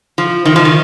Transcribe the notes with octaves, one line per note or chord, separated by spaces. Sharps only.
F3
D#3
F3
D#3